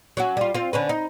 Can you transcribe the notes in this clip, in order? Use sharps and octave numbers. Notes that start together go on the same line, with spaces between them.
F#3 C#4 F#4
G3 F4
C4 F4
D3 C#4 B4
D#4